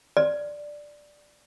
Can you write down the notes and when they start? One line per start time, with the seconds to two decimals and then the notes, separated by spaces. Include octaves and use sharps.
0.17 D5